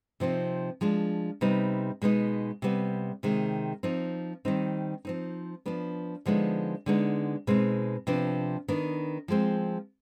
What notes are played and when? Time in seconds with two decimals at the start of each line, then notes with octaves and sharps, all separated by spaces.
0.20 C3 F3 C4 D#4
0.81 F3 G#3 D4
1.41 C3 G3 B3 D#4
2.02 B2 G#3 B3 D#4
2.62 C3 G3 B3
3.23 C3 D#3 G#3
3.83 F3 C4 D#4
4.45 D#3 G3 C4 D#4
5.05 F3 C4 D#4
5.66 F3 B3 D4
6.26 D3 F3 G#3 B3 D#4
6.86 D3 G#3 B3 D#4
7.47 B2 G#3 C4 D#4
8.07 C3 F3 B3 D4
8.68 D#3 B3 D4
9.28 F3 G#3 C4